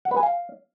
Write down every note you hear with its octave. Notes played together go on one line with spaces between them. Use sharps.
F#5
B4
G#5
F5